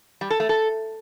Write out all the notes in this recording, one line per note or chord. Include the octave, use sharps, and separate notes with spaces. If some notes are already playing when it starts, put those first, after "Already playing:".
G3
A4
A3
A4